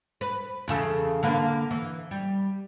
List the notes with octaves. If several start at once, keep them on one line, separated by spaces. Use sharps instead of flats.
B4
E2 C#3 A4
D3 A#3 B4
E3
G3